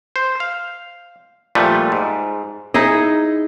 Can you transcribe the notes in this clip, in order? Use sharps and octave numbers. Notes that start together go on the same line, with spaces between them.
C5
F5
A#2 F3 G3 A3 B4
G#2
D#4 E4 G#4 D#5